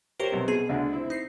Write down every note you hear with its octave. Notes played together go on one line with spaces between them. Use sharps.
G4 A#4 C5 C#5
B1 C3
B2 G#4
D2 D3
C4 E4
D#4 C7